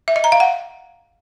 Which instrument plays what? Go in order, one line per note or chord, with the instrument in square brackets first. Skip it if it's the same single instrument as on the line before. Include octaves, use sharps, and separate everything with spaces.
[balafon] E5
D#5
A#5
F5
F#5